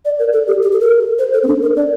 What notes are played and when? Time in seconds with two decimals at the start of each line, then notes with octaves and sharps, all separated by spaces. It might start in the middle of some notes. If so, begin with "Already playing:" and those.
0.05 D5
0.19 A#4
0.33 A4
0.47 G4
0.63 G4
0.72 A4
0.81 A#4
1.19 C5
1.33 A4
1.43 C4
1.47 D4
1.62 A#4
1.76 D5